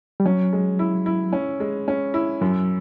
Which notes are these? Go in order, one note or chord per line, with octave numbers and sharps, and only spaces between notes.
G3
F#3 C#4
G#3
E4
E4
C#4
G#3
C#4
E4
F#2 F#3